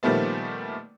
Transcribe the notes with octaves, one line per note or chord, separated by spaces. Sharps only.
A#2 D#3 F3 G3 A3 B3